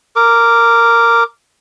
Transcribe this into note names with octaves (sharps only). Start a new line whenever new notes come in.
A#4 D6